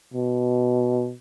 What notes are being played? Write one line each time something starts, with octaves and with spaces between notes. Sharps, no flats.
B2